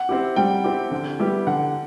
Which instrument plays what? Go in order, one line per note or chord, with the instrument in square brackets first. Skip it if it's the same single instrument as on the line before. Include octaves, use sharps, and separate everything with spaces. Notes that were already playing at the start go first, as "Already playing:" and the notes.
Already playing: [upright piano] F#5
[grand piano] C4 E4 G4
[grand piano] G3 [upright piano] G5
[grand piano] C4 E4 G4
D3
G3 B3 E4 G4
[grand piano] D3 [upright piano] F#5